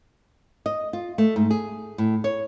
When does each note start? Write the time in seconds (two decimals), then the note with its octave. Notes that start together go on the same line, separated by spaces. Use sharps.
0.66 D#5
0.93 F4
1.18 A3
1.36 G#2
1.51 G#4
1.98 A2
2.24 C#5